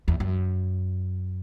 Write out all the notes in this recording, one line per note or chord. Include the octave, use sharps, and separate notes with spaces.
E2
F#2